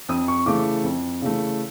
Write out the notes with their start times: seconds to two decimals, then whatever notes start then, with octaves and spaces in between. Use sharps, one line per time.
0.09 F2 D#6
0.28 C#6
0.46 C#3 E3 A3 D6
0.84 F2
1.22 C#3 E3 A3